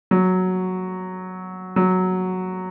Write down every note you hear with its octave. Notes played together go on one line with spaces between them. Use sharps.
F#3
F#3